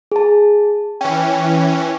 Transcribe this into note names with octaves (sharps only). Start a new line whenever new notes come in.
G#4 A5
E3 C#4 G5